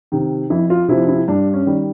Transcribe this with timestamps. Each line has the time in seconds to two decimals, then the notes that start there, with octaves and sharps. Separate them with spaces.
0.12 C3 D#3
0.50 F2 E4
0.70 F4
0.88 C3 F3 E4
1.08 E4
1.28 G2 D4
1.53 C#4
1.66 D#3 G3